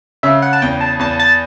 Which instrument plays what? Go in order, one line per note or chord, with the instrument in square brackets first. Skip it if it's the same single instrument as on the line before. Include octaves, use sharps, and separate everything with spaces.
[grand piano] C#3 [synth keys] E5
[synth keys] F#5
A5
[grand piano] E2 [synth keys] G5
[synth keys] A5
[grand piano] E2 [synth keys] A5
[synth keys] A5